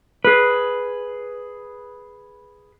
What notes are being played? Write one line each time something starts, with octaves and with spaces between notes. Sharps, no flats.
G#4 B4